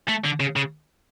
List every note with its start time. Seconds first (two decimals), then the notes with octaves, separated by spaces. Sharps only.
0.08 A3
0.25 D3
0.40 C#3
0.56 C#3